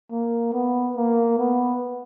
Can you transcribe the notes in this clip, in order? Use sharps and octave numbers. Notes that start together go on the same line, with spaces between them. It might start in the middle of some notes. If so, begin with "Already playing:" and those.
A#3
B3
A#3
B3